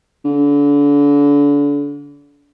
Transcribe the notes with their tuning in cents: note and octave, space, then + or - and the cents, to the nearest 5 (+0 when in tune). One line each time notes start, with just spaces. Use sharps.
D3 -35